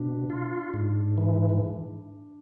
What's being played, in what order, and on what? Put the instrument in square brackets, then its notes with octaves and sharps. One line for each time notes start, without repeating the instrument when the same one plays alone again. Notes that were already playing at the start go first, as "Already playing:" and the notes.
Already playing: [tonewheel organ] B2 [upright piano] D4
[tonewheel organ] F4
G#2
E3